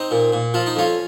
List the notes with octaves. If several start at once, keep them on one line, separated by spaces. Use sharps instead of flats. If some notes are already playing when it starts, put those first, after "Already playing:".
Already playing: C4 D#4
A#2
A#2
F3 F4
D#4
F2 C#4 F4